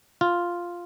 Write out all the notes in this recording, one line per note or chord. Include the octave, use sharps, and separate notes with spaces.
F4